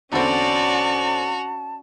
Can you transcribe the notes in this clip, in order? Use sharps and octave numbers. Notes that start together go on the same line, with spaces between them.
E2 D3 C4 C#4 F#4 D5 A5 F7